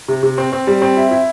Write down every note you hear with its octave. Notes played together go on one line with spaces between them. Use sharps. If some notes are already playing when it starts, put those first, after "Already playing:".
C3
C3
C4
C4
G3
C4
E4
E4